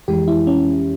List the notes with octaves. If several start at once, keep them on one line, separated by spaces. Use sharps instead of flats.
F2 E3 G#3 G4
E4
C#4